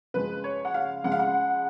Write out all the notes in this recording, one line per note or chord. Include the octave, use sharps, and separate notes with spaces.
C#3 F3 G#3 B4
C#5
F#5
F5
C#3 F3 G#3 F#5
F5
F#5